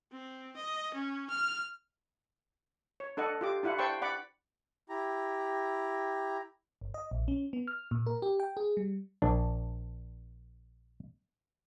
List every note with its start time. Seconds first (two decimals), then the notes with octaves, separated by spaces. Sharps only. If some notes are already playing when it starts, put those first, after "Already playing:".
0.13 C4
0.56 D#5
0.94 C#4
1.30 F6
3.00 C#5
3.17 D4 A4 D#5 F#5
3.41 F4 G4 D6
3.63 D4 E4 F4 F#5
3.78 C5 D5 G5 A5 B5 C#6
4.01 D5 F#5 B5 D6
4.89 E4 G4 A#5
6.81 G1
6.94 D#5
7.11 A#1
7.28 C#4
7.53 B3
7.68 F6
7.91 A#2
8.07 A#4
8.22 G4
8.40 G5
8.57 G#4
8.77 G3
9.22 A#1 D4